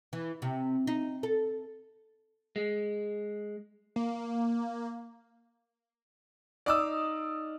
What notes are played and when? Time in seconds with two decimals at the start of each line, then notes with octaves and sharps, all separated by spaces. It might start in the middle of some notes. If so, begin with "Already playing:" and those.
0.13 E3
0.42 C3
0.87 D#4
1.23 A4
2.56 G#3
3.96 A#3
6.66 D#4 D5 D#5 F5 D6 E6